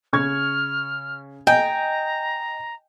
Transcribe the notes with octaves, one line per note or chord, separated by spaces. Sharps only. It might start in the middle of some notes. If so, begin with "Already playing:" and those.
C#3 C#6 F6 G#6
D#5 G5 G#5 A#5